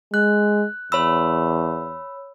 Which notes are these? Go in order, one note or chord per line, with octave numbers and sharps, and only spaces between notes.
G#3 F#6
E2 C#5 B5 E6